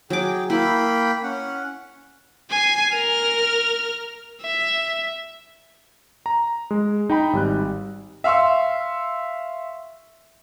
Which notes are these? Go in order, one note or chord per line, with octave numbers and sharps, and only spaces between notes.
F#3 G#4 G5 D6
A#3 E4 G5 B5
C#4 F#5
G#5 C7
A#4 F6
E5
A#5
G#3
D#4 G5 B5
G#1 G3 F#6
E5 F5 C6 C#6 E6